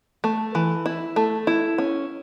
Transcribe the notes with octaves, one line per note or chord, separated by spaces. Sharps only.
A3
E3
E4
A3
E4
C#4